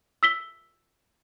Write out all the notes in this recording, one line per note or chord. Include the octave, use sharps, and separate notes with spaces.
E6 B6 G7